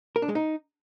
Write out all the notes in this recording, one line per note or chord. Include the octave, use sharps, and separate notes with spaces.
A#4
D4
G#3
D#4